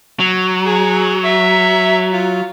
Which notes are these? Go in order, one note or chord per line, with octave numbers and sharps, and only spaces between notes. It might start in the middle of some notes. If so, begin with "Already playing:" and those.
F#3
G#4
E5
F4